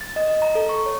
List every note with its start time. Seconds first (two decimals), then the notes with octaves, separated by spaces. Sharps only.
0.01 A6
0.16 D#5
0.28 D#5
0.42 A#5
0.55 A4
0.69 C#6
0.86 C#5